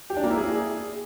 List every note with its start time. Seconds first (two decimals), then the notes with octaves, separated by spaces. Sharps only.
0.10 G4
0.17 D4
0.24 A#3
0.30 E4
0.37 G#4